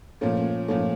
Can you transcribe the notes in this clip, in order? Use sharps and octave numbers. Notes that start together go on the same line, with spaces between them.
A#2 F3 A3 C#4
C#4
A#2 F3 A3 C#4